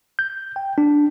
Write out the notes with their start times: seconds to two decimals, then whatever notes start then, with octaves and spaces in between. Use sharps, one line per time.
0.19 G6
0.56 G5
0.78 D4